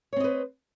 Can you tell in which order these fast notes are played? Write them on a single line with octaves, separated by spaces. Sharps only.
C#5 C4 D#5 B4